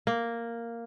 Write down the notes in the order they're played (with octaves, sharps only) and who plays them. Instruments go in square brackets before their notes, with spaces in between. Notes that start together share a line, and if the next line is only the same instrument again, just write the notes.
[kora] A#3